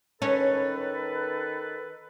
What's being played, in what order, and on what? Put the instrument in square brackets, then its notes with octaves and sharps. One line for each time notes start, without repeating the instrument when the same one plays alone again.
[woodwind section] D#3 A4 B4 [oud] C#4